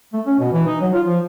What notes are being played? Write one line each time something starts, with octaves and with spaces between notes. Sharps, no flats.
A3
C#4
B2
E3
D#4
F#3
F4
F3